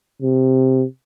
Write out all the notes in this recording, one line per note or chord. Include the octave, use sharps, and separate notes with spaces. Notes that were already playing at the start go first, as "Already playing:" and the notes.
C3